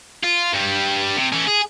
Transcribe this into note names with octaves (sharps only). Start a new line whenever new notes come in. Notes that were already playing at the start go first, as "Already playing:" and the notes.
F4
G2 G3
C3
E3 C#4
G#4